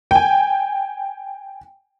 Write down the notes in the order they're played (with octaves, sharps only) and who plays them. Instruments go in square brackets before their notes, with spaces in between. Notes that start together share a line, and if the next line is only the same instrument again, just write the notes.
[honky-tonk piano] G5 G#5